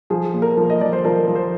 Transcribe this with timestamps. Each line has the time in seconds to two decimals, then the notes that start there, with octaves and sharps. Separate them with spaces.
0.10 F3 G#4
0.34 A#2
0.42 A#4
0.57 F3
0.70 D#5
0.81 F3 D5
0.93 C5
1.04 F3 A#4
1.28 F3
1.35 C5